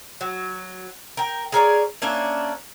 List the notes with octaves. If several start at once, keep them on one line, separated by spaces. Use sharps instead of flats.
F#3
A#4 G5
G#4 A#4 C#5 D5
A#3 C#4 D4 E5